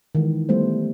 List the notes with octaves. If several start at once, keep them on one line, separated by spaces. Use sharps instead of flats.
D#3 E3 G#3
G3 A3 B3 C5